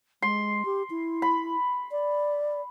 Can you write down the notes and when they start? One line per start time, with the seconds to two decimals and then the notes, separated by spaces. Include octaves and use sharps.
0.22 G#3 C6
0.65 G4
0.90 E4
1.22 B5
1.91 D5